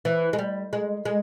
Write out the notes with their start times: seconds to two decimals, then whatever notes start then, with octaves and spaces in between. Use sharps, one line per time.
0.05 E3
0.33 G#3
0.39 G3
0.73 G#3
1.05 G#3